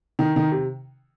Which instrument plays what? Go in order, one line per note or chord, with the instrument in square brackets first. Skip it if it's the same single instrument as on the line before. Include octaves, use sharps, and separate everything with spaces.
[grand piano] D#3
D#3
C3